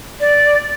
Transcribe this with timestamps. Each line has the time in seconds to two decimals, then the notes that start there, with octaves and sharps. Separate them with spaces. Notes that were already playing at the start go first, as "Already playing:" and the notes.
0.20 D5